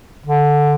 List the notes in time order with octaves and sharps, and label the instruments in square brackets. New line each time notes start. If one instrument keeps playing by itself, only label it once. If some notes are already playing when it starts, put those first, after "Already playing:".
[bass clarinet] D3